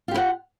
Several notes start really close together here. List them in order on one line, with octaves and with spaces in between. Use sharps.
F4 G4 E4 F#5